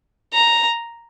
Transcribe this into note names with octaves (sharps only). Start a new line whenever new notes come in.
A#5